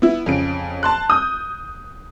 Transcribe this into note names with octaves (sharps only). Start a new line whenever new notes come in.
B3 E4
F2 C#3 D7
A5 C6 F#6
D#6 G6